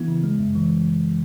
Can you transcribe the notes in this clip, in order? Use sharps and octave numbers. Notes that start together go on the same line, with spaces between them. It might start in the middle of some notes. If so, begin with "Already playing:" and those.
Already playing: E3 B3 E4
C#3
G#3
F#2
E3